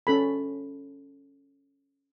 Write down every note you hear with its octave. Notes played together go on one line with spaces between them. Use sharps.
C#4 A4 B5